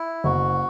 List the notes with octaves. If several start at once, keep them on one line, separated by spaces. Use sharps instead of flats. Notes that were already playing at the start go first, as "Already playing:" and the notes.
Already playing: E4
F#1 F#4